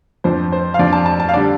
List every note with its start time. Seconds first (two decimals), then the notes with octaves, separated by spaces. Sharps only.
0.24 F2 F3 D4 C5
0.52 C5
0.74 F5
0.79 F2 F3 D4 D5
0.93 A5
1.06 A5
1.20 A5
1.29 F5
1.34 D3 G3 D5